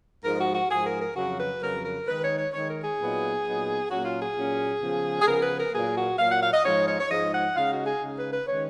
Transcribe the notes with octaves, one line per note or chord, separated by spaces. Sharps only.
G#2 F3 G#3 A#4
F#4
F#4
G#2 F3 G#3 G#4
A#4
A#4
F2 C#3 F#3 F#4
B4
F2 C#3 F#3 A#4
A#4
D#3 G#3 D#4 B4
C#5
C#5
D#3 G#3 D#4 C#5
A#4
G#4
A#2 F#3 B3 D#4
A#2 F#3 B3 D#4
A#2 F#3 A#3 C#4 F#4
F4
G#4
A#2 F#3 A#3 C#4
C#3 F3 B3
G#4
C#3 F3 B3 A#4
B4
A#4
A#2 F#3 A#3 G#4
F#4
A#2 F#3 A#3 F5
F#5
F5
D#5
G#2 F3 G#3 D#4 C#5
C#5
C#5
G#2 F3 G#3 D#4 D#5
F#5
C#3 G#3 D#4 F5
F#4
G#4
C#3 G#3 D#4
B4
B4
D#3 G#3 C#4 C#5